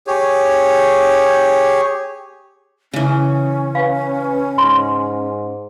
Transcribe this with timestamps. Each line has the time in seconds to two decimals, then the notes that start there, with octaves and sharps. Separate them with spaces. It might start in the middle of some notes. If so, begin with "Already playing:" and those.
0.07 G4 G#4 C#5
2.93 C#3 E3 C#4
3.75 B4 F5
4.58 G#2 C6